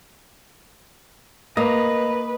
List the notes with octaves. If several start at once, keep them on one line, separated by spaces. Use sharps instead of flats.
A#3 B4 D#5 A#5